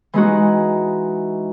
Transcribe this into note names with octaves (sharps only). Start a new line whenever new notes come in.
E3 G#3 D#4 F#4